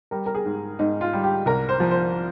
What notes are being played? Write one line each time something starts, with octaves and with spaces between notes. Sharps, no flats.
G3 A#4
A#4
G#4
G#2
G#2 D#4
F4
G3
G4
C2 A#4
C5
F3
C5